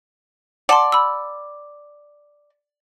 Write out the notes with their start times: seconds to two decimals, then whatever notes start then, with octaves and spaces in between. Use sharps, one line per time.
0.69 D5 F#5 A5 C6
0.92 B5 E6